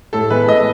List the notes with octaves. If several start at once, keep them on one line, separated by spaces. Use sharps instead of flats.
A2 A4
E3 G#3 B3 B4
A2 D#5